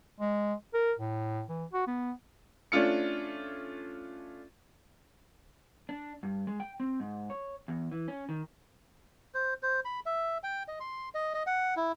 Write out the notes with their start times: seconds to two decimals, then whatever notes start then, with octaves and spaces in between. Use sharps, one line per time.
0.20 G#3
0.74 A#4
0.99 A2
1.49 E3
1.73 F#4
1.87 B3
2.72 A3 C#4 D4 F4 C#7
5.89 D4
6.23 G2
6.47 G#3
6.60 G5
6.80 C4
7.00 G#2
7.30 C#5
7.68 E2
7.92 E3
8.08 C#4
8.29 D#3
9.35 C5
9.63 C5
9.85 B5
10.06 E5
10.43 G5
10.68 D#5
10.80 C6
11.15 D#5
11.34 D#5
11.47 F#5
11.77 E4